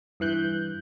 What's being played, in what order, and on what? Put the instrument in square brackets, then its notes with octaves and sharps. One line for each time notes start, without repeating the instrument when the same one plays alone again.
[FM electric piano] G2 E3 F#6 G6